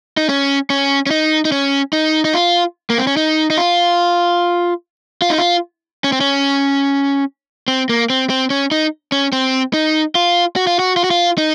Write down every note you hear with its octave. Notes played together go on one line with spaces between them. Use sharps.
D#4
C#4
C#4
C#4
D#4
D#4
C#4
D#4
D#4
F4
A#3
C4
C#4
D#4
D#4
F4
F4
D#4
F4
C#4
C4
C#4
C4
A#3
C4
C4
C#4
D#4
C#4
C4
D#4
F4
F#4
F4
F#4
F4
F#4
F4
D#4